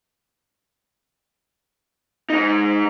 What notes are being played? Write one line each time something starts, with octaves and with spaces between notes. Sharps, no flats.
G#3 D#4